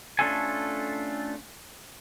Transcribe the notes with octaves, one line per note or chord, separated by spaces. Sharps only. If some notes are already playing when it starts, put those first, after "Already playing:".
A3 C#4 D4 F4 A4 G#5